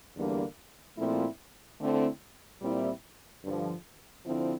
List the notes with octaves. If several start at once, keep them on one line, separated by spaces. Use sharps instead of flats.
E2 D3 G3 A#3 D4
A#2 F3 A3 C4 E4
D3 A3 C4 E4
A#2 G3 C4 E4
G2 D3 F3
D3 F3 C4 E4